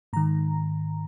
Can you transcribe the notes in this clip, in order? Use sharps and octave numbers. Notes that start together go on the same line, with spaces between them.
G#2 D#3 A#5